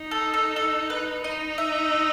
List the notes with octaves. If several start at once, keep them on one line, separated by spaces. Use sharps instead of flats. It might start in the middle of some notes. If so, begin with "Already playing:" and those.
Already playing: D#4
A4
A4
A4
B4
D#4 D#5
E5